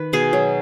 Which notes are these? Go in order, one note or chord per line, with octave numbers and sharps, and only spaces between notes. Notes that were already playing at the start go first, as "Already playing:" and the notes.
Already playing: D#3 B4
B2 G#4
F#3